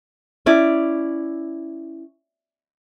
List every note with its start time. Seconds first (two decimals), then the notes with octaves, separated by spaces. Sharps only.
0.46 C#4 E4 D5